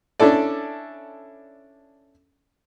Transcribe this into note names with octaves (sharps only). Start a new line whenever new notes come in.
C#4 D4 E4 A4 D5